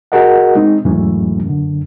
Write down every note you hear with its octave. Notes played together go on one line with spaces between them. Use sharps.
F#4 G#4 A#4 D#5 F#5
G#3 C4 D#4
E2 G#2 E3 F#3 A3 C#4
F#2 D3